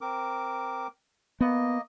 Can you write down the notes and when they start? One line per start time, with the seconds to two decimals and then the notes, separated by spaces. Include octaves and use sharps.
0.01 C4 A#4 D6
1.41 A#3 B3 D#5